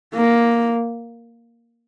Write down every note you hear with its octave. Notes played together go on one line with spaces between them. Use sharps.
A#3